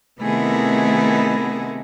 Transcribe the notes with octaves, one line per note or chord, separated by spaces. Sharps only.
C3 D#3 A3 B3 E4 G#4